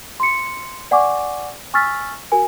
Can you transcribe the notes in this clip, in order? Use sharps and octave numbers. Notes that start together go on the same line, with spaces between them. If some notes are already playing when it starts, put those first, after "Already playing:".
C6 C#7
D5 F#5 G#5 C#6 D6
G#5 C#6 E6 F6 A6 B6
F#4 A#4 G#5